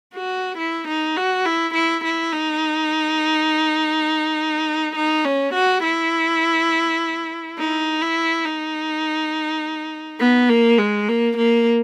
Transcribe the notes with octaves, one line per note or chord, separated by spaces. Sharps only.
F#4
E4
D#4
F#4
E4
E4
E4
D#4
D#4
C#4
F#4
E4
D#4
E4
D#4
B3
A#3
G#3
A#3
A#3